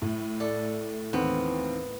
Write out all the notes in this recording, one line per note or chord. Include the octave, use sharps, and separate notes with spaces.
A2
A4 D5
D#2 E3 B3 C4